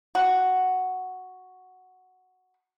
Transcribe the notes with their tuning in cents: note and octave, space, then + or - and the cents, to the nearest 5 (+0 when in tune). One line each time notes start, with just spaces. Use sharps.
F#4 +0